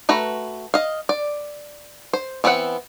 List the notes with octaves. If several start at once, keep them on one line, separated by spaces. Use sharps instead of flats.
A3 F#4 B4 A#5
D#5 F5
D5
C5
E3 B3 C4 E5 F#5